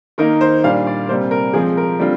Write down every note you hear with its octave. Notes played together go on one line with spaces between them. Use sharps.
D#3 A#3 D#4 A#4
C5
A#2 G3 D4 F5
D5
C3 G3 A#3 C5
A#4
F3 G#3 C4 G#4
A#4
D3 G3 C4 F4